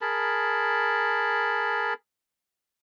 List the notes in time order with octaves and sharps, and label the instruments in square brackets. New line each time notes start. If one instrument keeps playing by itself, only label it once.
[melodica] G#4 A#4 A5 B5